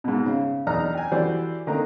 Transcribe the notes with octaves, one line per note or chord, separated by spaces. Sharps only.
G#2 B2
C#3
B1 E2 D4 D#4 A#5 F6
G5 G#5
E3 F#4 G4 A4 C5 D5
D3 D#3 A#3 C4 D#4 A#5